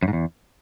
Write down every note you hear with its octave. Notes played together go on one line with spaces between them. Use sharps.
F#2
G#2
E2